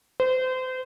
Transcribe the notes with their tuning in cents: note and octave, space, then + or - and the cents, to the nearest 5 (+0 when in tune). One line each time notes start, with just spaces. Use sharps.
C5 -30